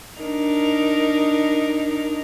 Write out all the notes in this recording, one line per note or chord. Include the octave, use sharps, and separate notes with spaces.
D4 D#4 A#4